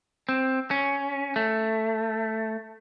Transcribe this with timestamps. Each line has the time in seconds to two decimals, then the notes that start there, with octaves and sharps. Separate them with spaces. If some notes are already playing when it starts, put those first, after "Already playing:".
0.29 C4
0.71 C#4
1.36 A3